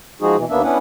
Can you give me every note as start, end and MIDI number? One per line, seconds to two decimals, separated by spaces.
0.21 0.36 53
0.21 0.36 56
0.21 0.36 63
0.21 0.36 66
0.21 0.36 68
0.36 0.45 47
0.36 0.45 52
0.50 0.62 39
0.50 0.62 58
0.50 0.62 59
0.50 0.62 62
0.50 0.62 76
0.63 0.78 59
0.63 0.78 61
0.63 0.78 62
0.63 0.78 64
0.63 0.78 71
0.63 0.78 78